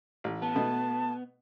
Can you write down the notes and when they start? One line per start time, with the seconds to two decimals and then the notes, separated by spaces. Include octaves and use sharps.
0.24 A1
0.42 B3 A5
0.55 B2 A3